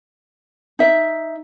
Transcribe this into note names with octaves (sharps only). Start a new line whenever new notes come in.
D#4 E5